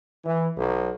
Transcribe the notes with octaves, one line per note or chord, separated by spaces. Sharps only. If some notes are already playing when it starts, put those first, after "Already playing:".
E3
B1